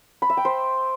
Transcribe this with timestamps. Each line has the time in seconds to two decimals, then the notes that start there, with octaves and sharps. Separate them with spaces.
0.22 B5
0.30 E5
0.37 G5
0.45 C5